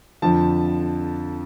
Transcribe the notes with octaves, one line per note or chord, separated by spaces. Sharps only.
F2 D3 F3 A5